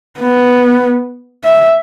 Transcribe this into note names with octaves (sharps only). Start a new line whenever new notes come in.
B3
E5